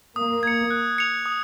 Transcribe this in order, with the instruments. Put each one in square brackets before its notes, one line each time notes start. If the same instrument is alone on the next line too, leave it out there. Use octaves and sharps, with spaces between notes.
[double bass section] A#3 [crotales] D#6
[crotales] G#6 C#7
F#6
C#7 F7
D#6